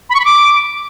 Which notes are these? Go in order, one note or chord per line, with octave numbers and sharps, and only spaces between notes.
B5
C#6
B5
D6